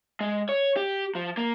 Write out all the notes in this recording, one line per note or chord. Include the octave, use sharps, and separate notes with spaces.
G#3
C#5
G4
F3
A#3